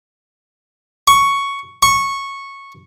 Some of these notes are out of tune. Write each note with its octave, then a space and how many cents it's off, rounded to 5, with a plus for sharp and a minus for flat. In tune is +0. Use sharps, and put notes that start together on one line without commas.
C#6 +5
C#6 -10